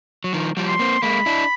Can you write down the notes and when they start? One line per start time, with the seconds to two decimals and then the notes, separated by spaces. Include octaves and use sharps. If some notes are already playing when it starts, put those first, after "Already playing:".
0.24 F#3
0.33 D#3 F3
0.57 F3 G3
0.68 C6
0.79 A#3 C4
1.03 G#3 A#3 B5
1.26 D4 E4